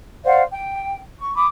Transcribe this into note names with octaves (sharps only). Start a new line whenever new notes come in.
C5 D5 F5 F#5
G5
C#6
B5 D6 D#6